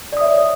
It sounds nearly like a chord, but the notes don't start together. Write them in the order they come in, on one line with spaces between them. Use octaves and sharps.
D5 D#6 E5 C#5